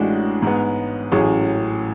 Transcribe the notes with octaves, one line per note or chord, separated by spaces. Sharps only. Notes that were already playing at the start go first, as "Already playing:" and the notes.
Already playing: A1 A2 G#3 D4 F#4
G#2 G#3 B3
A1 A2 F#3 C#4 G#4